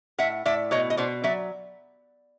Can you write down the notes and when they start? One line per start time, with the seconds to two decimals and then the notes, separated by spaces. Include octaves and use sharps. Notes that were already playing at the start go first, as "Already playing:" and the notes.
0.18 A2 E5 F#5
0.45 A2 D5 E5
0.71 B2 C#5 D#5
0.90 D#5
0.97 B2 C5 D5
1.24 F#3 D5 E5